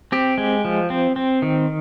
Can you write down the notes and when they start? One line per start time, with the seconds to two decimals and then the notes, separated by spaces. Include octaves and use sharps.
0.12 C4 G4
0.38 G#3
0.65 F3
0.90 C4
1.16 C4
1.42 D#3